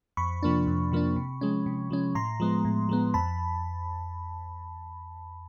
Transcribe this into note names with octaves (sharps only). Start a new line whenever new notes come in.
F2 B5 C#6
C3 F3 A#3 D4
F2
C3 F3 A#3 D4
C3
F3 G#3 C#4
C3
F3 G#3 C#4
A2 A#5 C6
F3 G#3 B3
A2
F3 G#3 B3
F2 A5 B5